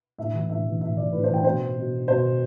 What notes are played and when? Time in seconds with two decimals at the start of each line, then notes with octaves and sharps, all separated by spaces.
0.18 A2 E5
0.33 E3
0.49 A2 E5
0.66 E3
0.81 A2 E5
0.97 E3 D5
1.13 A2 B4
1.24 C5
1.30 E3 G5
1.44 B2 C5
1.76 B2
2.08 B2 C5